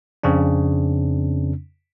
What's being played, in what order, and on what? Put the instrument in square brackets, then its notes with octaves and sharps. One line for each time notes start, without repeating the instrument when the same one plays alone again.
[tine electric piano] F2 C#3 C4 D4